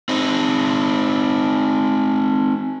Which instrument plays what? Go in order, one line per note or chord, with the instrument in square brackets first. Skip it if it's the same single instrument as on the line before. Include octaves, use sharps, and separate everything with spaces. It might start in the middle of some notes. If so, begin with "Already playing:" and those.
[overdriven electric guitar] C4 D#4